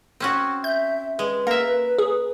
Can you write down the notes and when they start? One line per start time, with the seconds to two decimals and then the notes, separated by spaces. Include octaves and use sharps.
0.20 C4 C#4 F#4
0.64 E5 G6
1.19 G#3 B4
1.47 A#3 A#4 E5
1.99 G#4